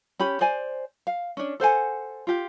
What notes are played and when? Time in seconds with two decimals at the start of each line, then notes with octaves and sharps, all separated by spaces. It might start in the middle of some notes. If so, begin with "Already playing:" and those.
0.20 C#4 G4 B5
0.41 C5 D5 G#5
1.07 F5
1.37 C#4 D4
1.60 A4 C5 F#5 G#5
2.27 F4 G4